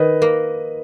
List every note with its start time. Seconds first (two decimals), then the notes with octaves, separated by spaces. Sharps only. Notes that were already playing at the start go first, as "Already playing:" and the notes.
Already playing: D#3 B4 D#5
0.22 A#3